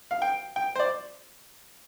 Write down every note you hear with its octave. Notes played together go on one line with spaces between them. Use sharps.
F5
G5
G5
C5
D5